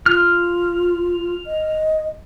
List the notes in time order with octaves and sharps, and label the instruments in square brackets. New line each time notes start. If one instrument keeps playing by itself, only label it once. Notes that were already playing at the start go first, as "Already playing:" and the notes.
[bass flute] F4 [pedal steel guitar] F6
[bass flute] D#5